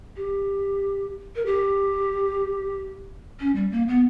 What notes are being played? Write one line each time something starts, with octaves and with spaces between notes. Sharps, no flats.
G4
A#4
G4
C#4
G3
A#3
B3